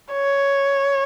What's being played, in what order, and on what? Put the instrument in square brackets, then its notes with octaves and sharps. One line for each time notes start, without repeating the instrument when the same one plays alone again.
[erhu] C#5